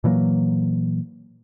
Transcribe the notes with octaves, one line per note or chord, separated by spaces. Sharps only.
A#2 E3 F#3 A#3